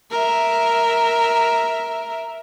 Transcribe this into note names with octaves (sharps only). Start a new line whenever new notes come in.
A#4 E5